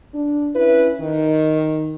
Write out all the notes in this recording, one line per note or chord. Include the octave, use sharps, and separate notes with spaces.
D4
C#4 E4 B4
D#3